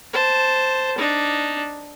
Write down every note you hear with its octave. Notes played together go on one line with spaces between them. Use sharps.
C5 A5
D4 D#4